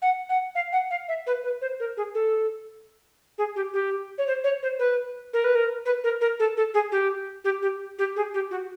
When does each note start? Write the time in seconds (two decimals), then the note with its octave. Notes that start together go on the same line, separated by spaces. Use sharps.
0.02 F#5
0.29 F#5
0.55 F5
0.72 F#5
0.90 F5
1.08 E5
1.27 B4
1.44 B4
1.61 C5
1.80 A#4
1.97 G#4
2.14 A4
3.38 G#4
3.56 G4
3.73 G4
4.18 C#5
4.27 C5
4.44 C#5
4.63 C5
4.79 B4
5.33 A#4
5.44 B4
5.55 A#4
5.85 B4
6.04 A#4
6.21 A#4
6.39 A4
6.57 A4
6.74 G#4
6.92 G4
7.44 G4
7.62 G4
7.98 G4
8.16 G#4
8.34 G4
8.51 F#4